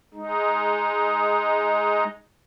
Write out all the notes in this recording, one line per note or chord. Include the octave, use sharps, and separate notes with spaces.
G#3 D#4